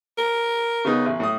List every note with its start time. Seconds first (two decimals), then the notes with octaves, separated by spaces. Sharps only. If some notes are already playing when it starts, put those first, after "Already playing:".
0.18 A#4
0.85 C#3 B3 D#4
1.06 A1
1.20 A2 D#6